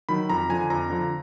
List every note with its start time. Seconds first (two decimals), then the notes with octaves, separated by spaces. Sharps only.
0.09 D#3 F#3 B5
0.29 F2 A#5
0.49 D3 F3 G#5
0.70 F2 A#5
0.90 D3 F3